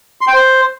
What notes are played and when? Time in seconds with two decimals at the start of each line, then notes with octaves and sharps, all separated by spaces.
0.21 C6
0.27 G5
0.33 C5